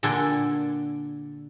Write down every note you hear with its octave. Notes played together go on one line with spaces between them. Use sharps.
A#2 D3 G#4 A4 G5 G#5